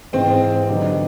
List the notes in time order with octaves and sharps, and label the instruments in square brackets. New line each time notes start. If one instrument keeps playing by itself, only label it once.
[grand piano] G#2 E3 G#3 [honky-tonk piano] C4
[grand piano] D3 F#3 B3 D#4 G4